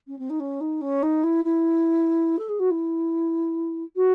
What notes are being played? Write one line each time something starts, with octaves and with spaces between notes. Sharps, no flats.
C#4
C4
D#4
C#4
D#4
C#4
D#4
E4
E4
A4
G#4
F#4
E4
F#4